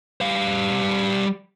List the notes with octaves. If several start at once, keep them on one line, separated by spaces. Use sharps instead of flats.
G3 F5